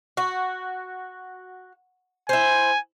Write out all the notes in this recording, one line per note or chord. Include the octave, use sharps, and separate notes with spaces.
F#4
E4 C5 G#5